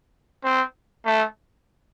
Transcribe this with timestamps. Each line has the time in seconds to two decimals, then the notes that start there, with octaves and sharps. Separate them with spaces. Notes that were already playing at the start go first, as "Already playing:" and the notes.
0.44 C4
1.05 A3